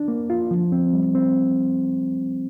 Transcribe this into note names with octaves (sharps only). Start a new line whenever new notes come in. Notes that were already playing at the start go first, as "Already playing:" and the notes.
Already playing: D4
A#3
F4
F3
C4
G3
C4